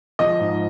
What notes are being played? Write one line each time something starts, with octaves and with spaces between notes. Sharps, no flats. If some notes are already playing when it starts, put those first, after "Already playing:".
F3 D#5
G#2